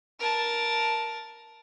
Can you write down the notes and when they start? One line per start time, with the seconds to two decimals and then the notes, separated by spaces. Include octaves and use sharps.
0.20 A#4 A5